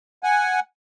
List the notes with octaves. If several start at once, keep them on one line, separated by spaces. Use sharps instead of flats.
F#5 G#5